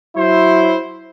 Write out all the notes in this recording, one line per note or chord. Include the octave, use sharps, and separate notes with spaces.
F#3 E4 C5